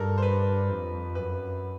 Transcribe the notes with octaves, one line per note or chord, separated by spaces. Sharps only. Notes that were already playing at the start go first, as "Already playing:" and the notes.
Already playing: G2 A4 A#4
C5
B4
F2
F#2 B4